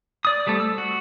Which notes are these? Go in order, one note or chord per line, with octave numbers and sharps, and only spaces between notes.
D5 D#6
G3 A3 C4 A4
E6
F#4